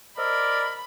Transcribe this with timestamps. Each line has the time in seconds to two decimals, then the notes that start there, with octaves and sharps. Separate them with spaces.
0.18 A#4 C5 D5 D#5 B5 E6